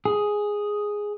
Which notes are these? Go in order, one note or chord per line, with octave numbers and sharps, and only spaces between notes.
G#4